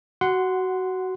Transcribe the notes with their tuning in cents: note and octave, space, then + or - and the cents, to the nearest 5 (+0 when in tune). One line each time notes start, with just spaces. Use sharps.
F#4 +15 F#5 +0 C6 -15